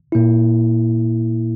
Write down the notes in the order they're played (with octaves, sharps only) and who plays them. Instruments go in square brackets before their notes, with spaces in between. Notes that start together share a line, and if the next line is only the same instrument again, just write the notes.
[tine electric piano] A#2 A#3 E4